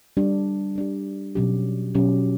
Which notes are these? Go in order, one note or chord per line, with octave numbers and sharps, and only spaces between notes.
G3 D4 G4
G3 D4 G4
B2 F#3 C#4 G4
B2 F#3 C#4 G4